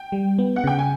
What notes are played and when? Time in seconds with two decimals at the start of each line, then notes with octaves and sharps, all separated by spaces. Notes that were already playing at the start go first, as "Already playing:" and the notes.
Already playing: G5
0.12 G3
0.39 B3
0.56 F#5
0.64 C#3 G5
0.79 G#5